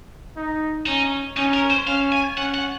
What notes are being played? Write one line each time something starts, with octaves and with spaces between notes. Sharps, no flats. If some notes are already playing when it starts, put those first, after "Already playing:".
D#4
C#4 D#4
C#4 D#4
A#4
C5
C#4 F5
G#5
C#4 F#5
F#5